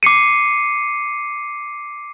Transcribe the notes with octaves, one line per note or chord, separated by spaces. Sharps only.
D6 C7 C#7 D#7